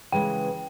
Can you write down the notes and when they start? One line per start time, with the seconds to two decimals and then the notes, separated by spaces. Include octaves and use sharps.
0.12 C#3 E3 G#3 G5